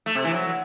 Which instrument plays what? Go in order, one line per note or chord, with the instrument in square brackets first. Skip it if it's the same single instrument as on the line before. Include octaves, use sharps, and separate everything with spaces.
[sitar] A3
C3
E3
F#3